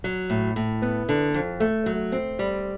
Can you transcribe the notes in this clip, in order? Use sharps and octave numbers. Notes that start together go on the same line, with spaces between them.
F#3
A2
A2
B3
D3
F2
A3
F#3
C4
G3